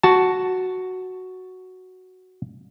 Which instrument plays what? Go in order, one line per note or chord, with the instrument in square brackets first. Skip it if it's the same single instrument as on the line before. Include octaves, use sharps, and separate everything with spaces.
[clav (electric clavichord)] F#4 A5